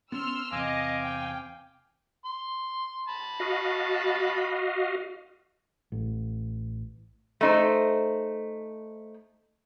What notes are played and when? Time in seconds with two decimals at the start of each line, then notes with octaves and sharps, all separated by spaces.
0.12 B3 C#4 C6 E6 F6
0.52 E2 C3 C4 D#5 F5 G#5 D6
1.04 G5
2.25 C6
3.08 A5 B5
3.40 F#4 D#5 F5
5.92 A1
7.41 A3 D#4 C5